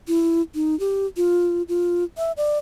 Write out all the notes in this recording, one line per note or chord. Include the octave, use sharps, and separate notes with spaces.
E4
D#4
G4
F4
F4
E5
D5